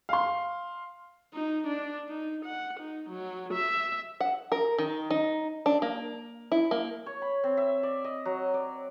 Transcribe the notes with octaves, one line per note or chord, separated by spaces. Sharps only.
F5 C6
D#4
D4
D#4
F#5
D#4
F#3
E5
F#5
A#4
D#3
D#4
D4
A#3
E4
A#3
C#5
B5
C4
E5
D5
D#5
F#3
D5